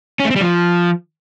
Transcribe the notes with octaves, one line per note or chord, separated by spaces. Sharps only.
C#4
A3
C4
G3
F3